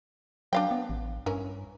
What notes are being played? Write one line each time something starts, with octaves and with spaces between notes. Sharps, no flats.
F#3 D4 F5 G5
B3
A1
G2 E3 C#4 A#4